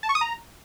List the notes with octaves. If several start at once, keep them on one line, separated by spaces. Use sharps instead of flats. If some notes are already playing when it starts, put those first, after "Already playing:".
A5
C#6
D#6
A#5